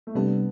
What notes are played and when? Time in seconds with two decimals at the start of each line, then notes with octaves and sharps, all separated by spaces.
0.07 A3
0.15 C3 G3 B3 D4 A4